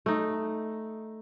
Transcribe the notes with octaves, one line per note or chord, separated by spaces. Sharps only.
A3 D#4